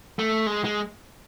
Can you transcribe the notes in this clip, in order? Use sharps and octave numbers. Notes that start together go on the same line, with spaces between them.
A3
G#3
G#3